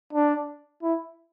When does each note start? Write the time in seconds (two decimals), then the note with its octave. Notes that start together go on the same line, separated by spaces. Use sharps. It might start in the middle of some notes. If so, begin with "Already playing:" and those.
0.13 D4
0.83 E4